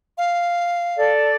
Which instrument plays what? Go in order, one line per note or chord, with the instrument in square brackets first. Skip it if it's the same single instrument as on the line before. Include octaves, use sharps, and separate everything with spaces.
[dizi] F5
[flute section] A4 D5